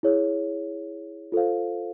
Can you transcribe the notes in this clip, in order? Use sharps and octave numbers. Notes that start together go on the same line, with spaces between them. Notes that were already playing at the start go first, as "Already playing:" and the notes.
E4 G#4 C#5
F4 A4 C5 F5